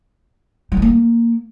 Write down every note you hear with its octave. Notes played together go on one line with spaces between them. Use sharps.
G3
D#3
A#3